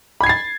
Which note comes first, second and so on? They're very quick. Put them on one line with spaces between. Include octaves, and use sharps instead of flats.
B5 G#6 C7 A6